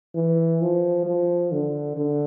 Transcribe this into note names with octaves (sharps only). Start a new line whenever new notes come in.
E3
F3
F3
D3
D3